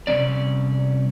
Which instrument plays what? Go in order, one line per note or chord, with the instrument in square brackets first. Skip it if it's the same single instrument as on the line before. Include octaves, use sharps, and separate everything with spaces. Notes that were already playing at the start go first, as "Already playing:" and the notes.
[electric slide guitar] C3 G3 C#4 D5